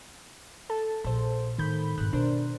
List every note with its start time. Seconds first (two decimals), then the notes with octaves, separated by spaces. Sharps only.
0.70 A4 A5
1.04 A#1 A4 C5
1.59 A2 D#3 B5 G6
1.98 G#2 C3 F#6
2.13 B2 A#3 D4 A#4 C5